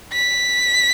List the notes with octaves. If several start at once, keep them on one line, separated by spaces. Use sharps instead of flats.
B6